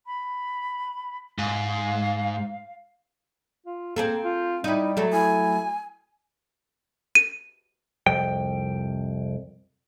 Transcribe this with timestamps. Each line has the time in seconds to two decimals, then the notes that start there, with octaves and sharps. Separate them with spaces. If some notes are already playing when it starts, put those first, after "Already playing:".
0.06 B5
1.38 G#2 F5
3.66 F4
3.96 A#3 C4 G#4 A4
4.24 F4
4.64 G3 D#4 E4
4.97 F#3 A3 A4
5.12 E4 G#5
7.15 D#7
8.07 C2 F2 G5